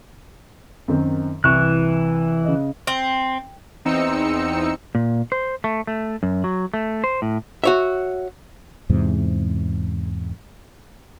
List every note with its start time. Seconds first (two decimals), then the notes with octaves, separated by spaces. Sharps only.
0.88 F#2 D#3 C4
1.44 C2 E3 C#6 F#6
2.44 C#3 D#5
2.87 C4
3.85 E2 C4 D#4 E6 C#7
4.95 A#2
5.32 C5
5.64 A3
5.87 A3
6.23 F#2
6.44 F#3
6.74 A3
7.04 C5
7.22 A2
7.64 F#4 C#5 E5
8.89 E2 G#2 C3